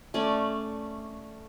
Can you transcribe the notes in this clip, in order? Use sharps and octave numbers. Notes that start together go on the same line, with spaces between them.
A3 C#4 D5